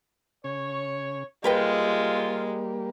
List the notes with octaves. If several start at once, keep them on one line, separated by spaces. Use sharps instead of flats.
C#3 C#5
C3 G3 G#3 A#3 F4 A#4 B4 G5